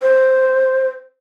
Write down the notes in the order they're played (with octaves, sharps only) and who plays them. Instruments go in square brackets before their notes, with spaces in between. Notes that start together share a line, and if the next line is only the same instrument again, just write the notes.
[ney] C5